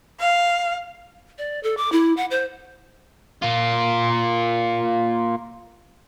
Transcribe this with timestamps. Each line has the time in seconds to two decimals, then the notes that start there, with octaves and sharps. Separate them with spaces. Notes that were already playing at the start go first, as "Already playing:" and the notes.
0.20 F5
1.38 D5
1.63 A4
1.77 D6
1.92 E4
2.17 F#5
2.31 C5
3.42 A#3 F4